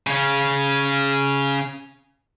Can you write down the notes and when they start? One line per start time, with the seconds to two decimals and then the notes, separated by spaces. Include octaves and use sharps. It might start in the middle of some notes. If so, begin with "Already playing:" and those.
0.07 C#3 C#4